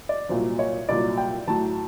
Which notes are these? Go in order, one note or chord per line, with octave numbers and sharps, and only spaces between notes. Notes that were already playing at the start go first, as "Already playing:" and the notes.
D5
C2 A#2 F#3 C5
C#5
C2 A#2 F#3 D5
G5
A2 F#3 A5